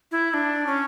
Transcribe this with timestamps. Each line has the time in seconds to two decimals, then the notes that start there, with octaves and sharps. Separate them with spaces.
0.11 E4
0.30 E4
0.34 D4
0.67 C#4